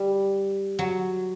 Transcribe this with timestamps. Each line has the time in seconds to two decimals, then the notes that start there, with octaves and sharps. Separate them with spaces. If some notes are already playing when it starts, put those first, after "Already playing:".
Already playing: G3
0.79 F#3